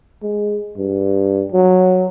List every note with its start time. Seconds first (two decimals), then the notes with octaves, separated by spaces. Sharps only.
0.23 G#3
0.78 G2
1.52 F#3